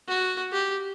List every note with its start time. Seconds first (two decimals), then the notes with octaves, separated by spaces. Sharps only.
0.08 F#4
0.52 G4